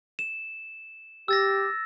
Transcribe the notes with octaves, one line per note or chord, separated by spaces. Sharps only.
E7
G4 E6 A6 A#6